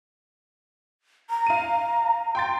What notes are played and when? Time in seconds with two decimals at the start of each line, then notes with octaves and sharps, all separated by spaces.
1.30 A#5
1.47 F5 D#7
2.35 G5 C6 A6